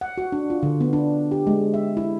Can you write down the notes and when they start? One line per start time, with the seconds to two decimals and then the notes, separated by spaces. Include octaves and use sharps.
0.01 F#5
0.18 F#4
0.32 D4
0.50 F4
0.63 D3
0.81 B3
0.93 D4
1.31 G4
1.47 G#3
1.74 E5
1.97 E4